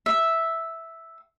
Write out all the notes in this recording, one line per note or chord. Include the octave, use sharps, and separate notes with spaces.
E5